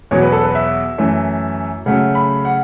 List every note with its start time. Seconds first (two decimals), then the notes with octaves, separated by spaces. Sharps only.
0.11 E2 B2 F#3 C#5
0.22 B4
0.32 A4
0.43 B4
0.55 E5
0.98 F#2 E3 A3
1.86 C#3 F#3 A3 F#5
2.15 B5
2.45 F#5